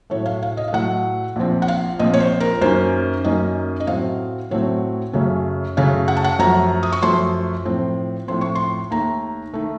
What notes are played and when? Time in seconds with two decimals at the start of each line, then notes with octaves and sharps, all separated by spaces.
0.10 A2 F#3 A3 C#5
0.26 F5
0.42 F5
0.57 D#5
0.68 F5
0.73 A2 F#3 A3 F#5
1.36 A#1 A#2 F3 C4
1.62 F#5
1.68 F5
1.99 A#1 A#2 F3 C4 D#5
2.14 C#5
2.20 C5
2.40 A#4
2.61 F#2 D#3 A#3 C#4 C5
3.24 F#2 D#3 A#3 C#4 D#5
3.80 D#5
3.87 A2 F#3 A3 C4 F5
4.51 A2 F#3 A3 C4 C#5
5.13 F#2 C#3 A3 C#4
5.77 F#2 C#3 A3 C#4 F5
6.08 F#5
6.17 A5
6.24 F#5
6.39 F#2 F3 A3 A#5
6.83 D#6
6.92 C#6
7.02 F#2 F3 A3 C6
7.65 A2 F3 C4
8.28 A2 F3 C4 C6
8.41 C#6
8.55 C6
8.91 D#2 D#3 A3 A#5
9.53 D#3 A3